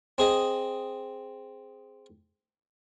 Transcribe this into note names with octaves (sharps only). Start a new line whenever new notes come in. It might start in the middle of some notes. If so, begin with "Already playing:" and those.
C4 G#4 D#5